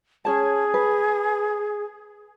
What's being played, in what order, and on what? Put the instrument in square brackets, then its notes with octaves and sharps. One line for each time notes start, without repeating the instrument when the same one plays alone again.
[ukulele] C#4 C#5 A5 [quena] G#4
[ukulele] B4